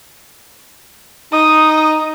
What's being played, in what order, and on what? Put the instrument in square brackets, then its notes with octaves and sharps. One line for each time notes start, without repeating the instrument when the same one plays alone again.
[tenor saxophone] D#4 [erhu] D#6